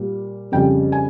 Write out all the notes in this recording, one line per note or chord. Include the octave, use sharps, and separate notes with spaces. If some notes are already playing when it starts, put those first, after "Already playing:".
Already playing: A#2 G3 A#3
F2 C#3 G3 G5
G#5